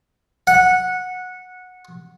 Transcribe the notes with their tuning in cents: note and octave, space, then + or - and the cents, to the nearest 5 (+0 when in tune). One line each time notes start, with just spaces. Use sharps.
F#5 -15